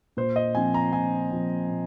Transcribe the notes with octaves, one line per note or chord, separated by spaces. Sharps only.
A#2 C5
D#5
F3 C4 G#5
A#5
A#2 G#5
F3 C4
A#2